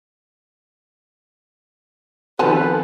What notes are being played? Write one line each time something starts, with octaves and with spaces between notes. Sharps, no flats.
D#3 F3 B3 C4 A4 B4 G#5 A5